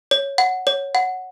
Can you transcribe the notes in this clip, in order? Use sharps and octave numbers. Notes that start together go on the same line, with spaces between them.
C#5
F#5
C#5
F#5